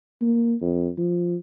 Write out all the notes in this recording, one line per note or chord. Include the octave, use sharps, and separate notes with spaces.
A#3
F2
F3